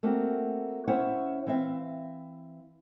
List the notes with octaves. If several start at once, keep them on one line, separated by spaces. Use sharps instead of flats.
A3 A#3 C4 F#4
C#4 E4 C5 C#5 E5 F#5
E3 C4 E5 F5